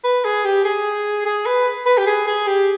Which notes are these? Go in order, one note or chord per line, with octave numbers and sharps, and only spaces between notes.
B4
G#4
G4
G#4
G#4
B4
B4
G4
G#4
G#4
G4